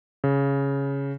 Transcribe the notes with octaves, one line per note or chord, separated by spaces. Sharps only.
C#3